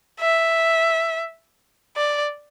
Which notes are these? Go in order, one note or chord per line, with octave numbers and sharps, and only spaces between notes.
E5
D5